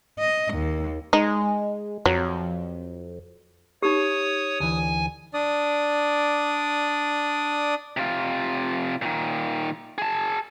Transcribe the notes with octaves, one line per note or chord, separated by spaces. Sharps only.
D#5
D#2
G#3 D#4
F2 F#3
D#4 G4 C#5 D#6
D2 E3 G#5
D4 D5 D#6
C3 F4
A#2 D#3
G#4 A5